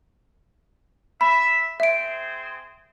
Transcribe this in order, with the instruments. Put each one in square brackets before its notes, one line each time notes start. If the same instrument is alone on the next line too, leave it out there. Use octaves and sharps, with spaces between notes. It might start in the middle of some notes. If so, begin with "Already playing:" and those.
[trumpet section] E5 [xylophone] B5
[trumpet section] C4 G#4 C5 [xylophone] E5 D7